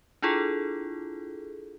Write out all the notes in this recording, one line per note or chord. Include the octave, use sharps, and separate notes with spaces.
D4 E4 F4 G#4 A4